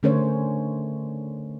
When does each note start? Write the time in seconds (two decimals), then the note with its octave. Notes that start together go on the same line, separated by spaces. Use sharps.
0.03 D3 A3 C#4 A#4 C5 C#5